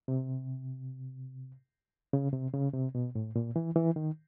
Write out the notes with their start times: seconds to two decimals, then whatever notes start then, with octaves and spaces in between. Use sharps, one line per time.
0.08 C3
2.13 C#3
2.33 C3
2.54 C#3
2.74 C3
2.95 B2
3.15 A2
3.36 A#2
3.56 E3
3.76 E3
3.96 D#3